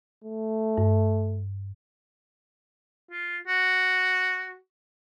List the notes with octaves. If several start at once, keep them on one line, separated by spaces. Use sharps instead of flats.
A3
G2
F4
F#4